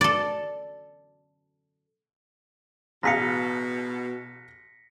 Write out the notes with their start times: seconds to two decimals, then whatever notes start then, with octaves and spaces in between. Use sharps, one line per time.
0.01 A4 D5
3.03 A1 B2 G#4 F5 A#6 B6 C#7